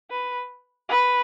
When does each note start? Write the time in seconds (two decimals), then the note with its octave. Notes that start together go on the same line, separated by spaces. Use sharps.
0.11 B4
0.89 B4